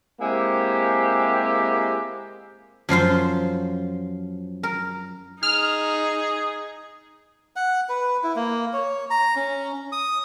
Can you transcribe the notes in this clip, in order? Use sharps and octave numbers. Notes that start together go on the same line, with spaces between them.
G#3 A#3 C4 E4 G4
F#2 F3 F4 C5
A#4
D#4 G#4 F6
F#5
B4
E4
A#3
C#5
A#5
C#4
D#6